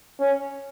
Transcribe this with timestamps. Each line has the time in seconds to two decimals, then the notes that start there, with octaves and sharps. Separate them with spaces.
0.20 C#4